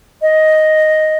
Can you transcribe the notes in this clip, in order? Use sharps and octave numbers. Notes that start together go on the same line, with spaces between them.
D#5